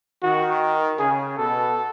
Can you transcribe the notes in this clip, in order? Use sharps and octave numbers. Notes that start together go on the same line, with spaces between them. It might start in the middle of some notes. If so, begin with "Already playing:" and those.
D#3 F#4
C#3 G#4
B2 A4